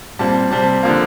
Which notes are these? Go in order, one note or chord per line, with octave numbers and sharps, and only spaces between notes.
A#2 G3 C4 A5
C3 G3 C4 A5
D3 F3 A#3